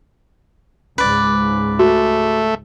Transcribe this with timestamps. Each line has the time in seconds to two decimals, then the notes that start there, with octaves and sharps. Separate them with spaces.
0.98 C#2 G#2 B4 D5
1.79 A3 F#4